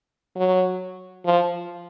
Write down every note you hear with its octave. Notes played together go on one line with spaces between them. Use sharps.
F#3
F3